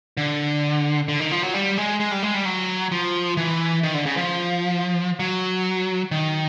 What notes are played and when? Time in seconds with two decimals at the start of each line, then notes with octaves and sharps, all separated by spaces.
0.17 D3
1.08 D3
1.20 D#3
1.32 F3
1.43 F#3
1.54 G3
1.78 G#3
2.00 G#3
2.11 G3
2.23 G#3
2.34 G3
2.45 F#3
2.92 F3
3.37 E3
3.83 D#3
3.94 D3
4.06 C#3
4.17 F3
5.19 F#3
6.11 D#3